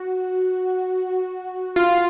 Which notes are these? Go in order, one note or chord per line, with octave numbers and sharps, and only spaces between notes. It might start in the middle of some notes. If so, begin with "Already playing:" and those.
Already playing: F#4
F4